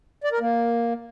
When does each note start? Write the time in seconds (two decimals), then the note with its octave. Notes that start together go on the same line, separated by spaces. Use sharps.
0.24 D5
0.32 A#4
0.40 A#3